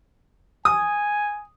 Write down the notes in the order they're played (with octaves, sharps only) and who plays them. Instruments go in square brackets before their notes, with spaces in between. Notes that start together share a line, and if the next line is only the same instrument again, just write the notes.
[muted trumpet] G#5 [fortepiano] D#6